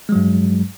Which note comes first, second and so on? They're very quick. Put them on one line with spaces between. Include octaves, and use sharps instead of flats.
G#3 F#3 G2